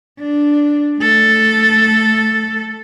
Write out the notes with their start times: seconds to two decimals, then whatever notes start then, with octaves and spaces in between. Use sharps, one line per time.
0.20 D4
0.99 A3 A4